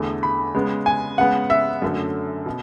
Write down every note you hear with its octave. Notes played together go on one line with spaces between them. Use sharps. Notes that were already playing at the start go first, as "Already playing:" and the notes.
Already playing: E2 D3 A3
B5
C#3 G#3 B3
G#5
C#3 G#3 B3 F#5
E5
F#2 D3 A3
B2